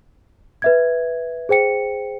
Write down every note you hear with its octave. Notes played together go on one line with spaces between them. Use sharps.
B4 E5 G#6
G#4 C5 G5 C#7